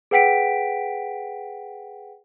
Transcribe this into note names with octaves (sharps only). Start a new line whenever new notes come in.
G#4 B4 F#5 G5 B6 D7